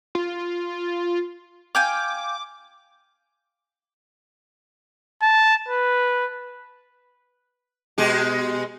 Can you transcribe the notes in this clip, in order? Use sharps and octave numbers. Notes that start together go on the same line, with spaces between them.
F4
F5 G5 G#5 D6
A5
B4
B2 G#3 G4